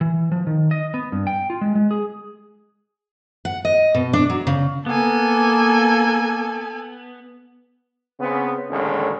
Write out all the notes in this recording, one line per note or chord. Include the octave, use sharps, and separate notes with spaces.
E3
F3
D#3
D#5
B3
G2
G5
F4
G#3
G#3
G#4
F#5
D#5
B2
D4
F#3
C#3
A#3 B3 A4 G#5
C#3 B3 C4
A1 D#2 D3 G#3 C#4 A4